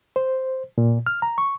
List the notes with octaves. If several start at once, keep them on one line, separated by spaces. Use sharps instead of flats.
C5
A#2
F6
A#5
C#6